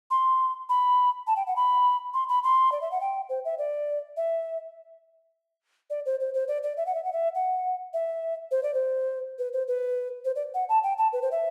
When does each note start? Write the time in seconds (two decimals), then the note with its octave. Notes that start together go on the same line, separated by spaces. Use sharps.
0.11 C6
0.69 B5
1.27 A5
1.36 G5
1.47 F#5
1.56 B5
2.14 C6
2.29 B5
2.43 C6
2.72 D5
2.81 E5
2.91 F#5
3.01 G5
3.29 C5
3.45 E5
3.58 D5
4.17 E5
5.90 D5
6.06 C5
6.20 C5
6.34 C5
6.48 D5
6.63 D5
6.77 E5
6.86 F#5
6.95 E5
7.04 F#5
7.13 E5
7.35 F#5
7.94 E5
8.51 C5
8.63 D5
8.74 C5
9.39 B4
9.53 C5
9.68 B4
10.25 C5
10.36 D5
10.54 F#5
10.69 A5
10.83 G5
10.98 A5
11.13 B4
11.22 C5
11.32 E5